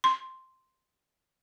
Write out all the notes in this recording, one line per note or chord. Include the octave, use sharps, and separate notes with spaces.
C6